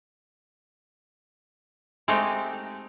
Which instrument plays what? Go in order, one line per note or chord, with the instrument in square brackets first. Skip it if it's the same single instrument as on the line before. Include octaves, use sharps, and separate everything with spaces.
[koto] G#3 A3 C4 D#4 G4